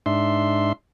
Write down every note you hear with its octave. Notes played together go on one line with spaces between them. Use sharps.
G#2 D4 E5 C6